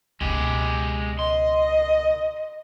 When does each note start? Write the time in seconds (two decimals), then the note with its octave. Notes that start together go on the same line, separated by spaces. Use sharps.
0.21 C#2 B2 G#3 G4
1.19 D#5 C6